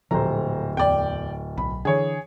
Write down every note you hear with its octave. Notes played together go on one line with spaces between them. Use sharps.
D1 D2 A#2 F3 G4 A4 C5 A#5
E2 D5 G5
B1 B5
D3 E3 G#4 C#5